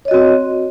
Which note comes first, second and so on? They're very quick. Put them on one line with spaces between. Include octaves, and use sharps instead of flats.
C#5 D#5 F#4 C4